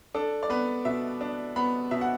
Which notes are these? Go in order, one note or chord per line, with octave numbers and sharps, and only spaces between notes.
D4 A4
D5
B3 B4
B2 E5
D4
B3 B5
B2 E5
F#5